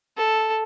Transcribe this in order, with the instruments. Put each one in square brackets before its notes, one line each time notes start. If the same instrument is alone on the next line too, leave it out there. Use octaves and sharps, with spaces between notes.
[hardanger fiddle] A4